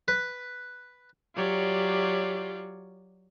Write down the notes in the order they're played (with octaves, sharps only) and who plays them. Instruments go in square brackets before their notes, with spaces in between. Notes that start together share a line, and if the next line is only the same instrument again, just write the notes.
[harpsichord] B4
[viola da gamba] F#3 C#5 D5 [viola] F4 G4